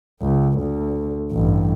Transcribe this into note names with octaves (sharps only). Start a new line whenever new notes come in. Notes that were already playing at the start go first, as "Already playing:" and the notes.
C#2
D2
A1 G2